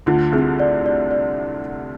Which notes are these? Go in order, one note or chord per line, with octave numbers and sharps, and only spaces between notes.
D2 D3 F4
C2 C3 G#4
D5
D5
D5